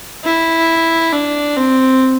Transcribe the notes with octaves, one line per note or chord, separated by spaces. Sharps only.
E4
D4
C4